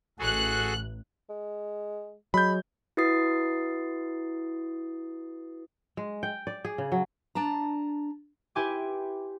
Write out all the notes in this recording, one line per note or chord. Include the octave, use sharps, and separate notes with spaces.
A1 F#4 G#4 A4 F#6
G#3
F#3 G#3 B5 G6
E4 F#4 B4 D#6 A6 C7
G#3
G5
D5
G#4
C#3
F#3
D4 A5 A#5
E4 G4 B4 G#5 C6 D6